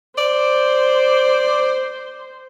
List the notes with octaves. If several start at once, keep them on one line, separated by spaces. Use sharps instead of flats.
C5 D5